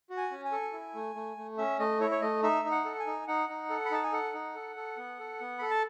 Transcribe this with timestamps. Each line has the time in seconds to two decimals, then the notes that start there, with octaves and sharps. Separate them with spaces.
0.10 F#4
0.17 G#5
0.31 C#4
0.45 G#5
0.52 A4
0.73 E4
0.95 A3
1.15 A3
1.37 A3
1.58 C#4 E5
1.79 A3 D#5
2.00 E4 C#5
2.11 C#5
2.21 A3 D#5
2.43 D#4 E5
2.65 D#4
2.71 F#5
2.85 A4
3.00 G#5
3.07 D#4
3.27 D#4 F#5
3.49 D#4
3.70 A4
3.85 B5
3.91 D#4 A5
4.03 G#5
4.13 A4 F#5
4.34 D#4
4.55 A4
4.76 A4
4.97 B3
5.19 A4
5.41 B3
5.59 A4 B5
5.71 A5